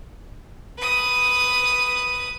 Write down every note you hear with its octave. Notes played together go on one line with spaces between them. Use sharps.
B4 D#6